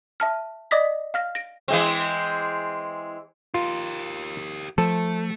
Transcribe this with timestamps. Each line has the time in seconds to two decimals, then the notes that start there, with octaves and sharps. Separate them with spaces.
0.20 E5 A5 F6
0.71 D5 D#5 D6 D#6 A#6 B6
1.14 F5 F6 A#6
1.35 A#6 D7
1.68 E3 G#3 C4
3.54 F4 G4 A#4
4.78 F3 A3 A4